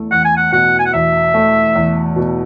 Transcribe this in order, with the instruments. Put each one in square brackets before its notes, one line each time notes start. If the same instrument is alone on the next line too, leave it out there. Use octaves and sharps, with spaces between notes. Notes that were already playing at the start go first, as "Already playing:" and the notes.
Already playing: [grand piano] E2 A3
[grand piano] E2 [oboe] F#5
[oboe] G#5
F#5
[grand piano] B2 [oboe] F#5
[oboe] G#5
F#5
[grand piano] E2 [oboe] E5
[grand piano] A3
E2
B2